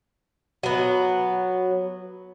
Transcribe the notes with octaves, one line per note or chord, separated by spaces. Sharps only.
F#3 B3